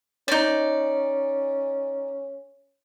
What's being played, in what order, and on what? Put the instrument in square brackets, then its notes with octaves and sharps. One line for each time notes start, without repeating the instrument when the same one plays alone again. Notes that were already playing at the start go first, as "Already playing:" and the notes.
[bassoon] C#4 [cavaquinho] D#4 D5